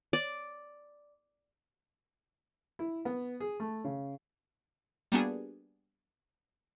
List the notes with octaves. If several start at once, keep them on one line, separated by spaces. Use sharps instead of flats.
D5
E4
B3
G#4
A3
C#3
G3 A#3 B3 D4 F#4 G#4